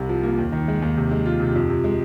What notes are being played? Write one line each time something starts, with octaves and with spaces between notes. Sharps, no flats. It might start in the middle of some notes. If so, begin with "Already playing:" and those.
Already playing: C2 C3
F3
A#3
D#2
D#3
G#3
D#2
C3
G#3
F4
C3
F2
C3
G#3